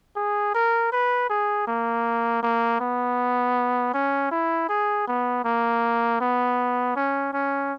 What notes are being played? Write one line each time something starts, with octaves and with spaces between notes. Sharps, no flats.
G#4
A#4
B4
G#4
A#3
A#3
B3
C#4
E4
G#4
B3
A#3
B3
C#4
C#4